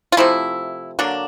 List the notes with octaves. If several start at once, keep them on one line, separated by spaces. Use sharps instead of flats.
F4
C3 F3 A3 E4
D3 F#3 A#3 D4